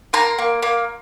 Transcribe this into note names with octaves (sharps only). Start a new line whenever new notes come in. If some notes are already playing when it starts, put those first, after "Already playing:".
A#3 A#5 C6
A#3
A#3